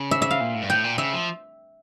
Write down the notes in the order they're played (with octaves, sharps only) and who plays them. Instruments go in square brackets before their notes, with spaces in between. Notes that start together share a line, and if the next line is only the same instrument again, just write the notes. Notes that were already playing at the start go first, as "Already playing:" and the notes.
Already playing: [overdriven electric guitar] C#3
[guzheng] E5
E5
F5
[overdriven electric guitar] A#2
A2
G2
[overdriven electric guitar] A2 [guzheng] G5
[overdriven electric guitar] A#2
[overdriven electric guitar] C#3 [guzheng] E5
[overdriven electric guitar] F3